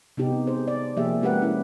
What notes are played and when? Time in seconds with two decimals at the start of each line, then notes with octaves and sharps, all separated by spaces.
0.17 C3 B3 D#4 G4
0.47 G#4 C5
0.68 D5
0.97 C3 F3 A#3 G4 G#4 E5
1.21 G#3 C#4 G4 A#4 B4 F#5
1.42 C#4 E4